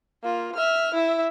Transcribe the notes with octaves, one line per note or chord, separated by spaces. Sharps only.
A#3 F4
E5 F6
E4 E5